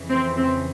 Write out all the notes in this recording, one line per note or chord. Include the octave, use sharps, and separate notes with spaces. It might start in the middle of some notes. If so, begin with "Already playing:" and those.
Already playing: F2 C#3 E3
C4
C4